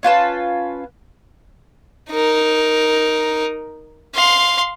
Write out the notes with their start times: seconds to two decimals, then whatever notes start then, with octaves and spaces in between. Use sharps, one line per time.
0.03 C#4 F4 B4 A5
2.10 D#4 A#4
4.14 F5 C6